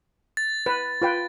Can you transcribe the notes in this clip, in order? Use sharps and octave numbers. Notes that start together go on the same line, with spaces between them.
A6
B4
F4 B4 G5